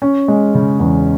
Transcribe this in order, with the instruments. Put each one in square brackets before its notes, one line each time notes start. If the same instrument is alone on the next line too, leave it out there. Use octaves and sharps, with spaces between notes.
[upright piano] C#4
G#3
C#3
E2